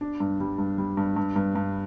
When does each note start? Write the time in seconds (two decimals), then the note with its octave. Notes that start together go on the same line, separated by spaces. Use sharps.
0.01 D4
0.20 G2
0.40 G3
0.59 G2
0.78 G3
0.97 G2
1.17 G2
1.36 G2
1.55 G2